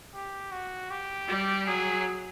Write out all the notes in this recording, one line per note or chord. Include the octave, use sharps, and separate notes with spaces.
G4
F#4
G4
G3
F#3 G#4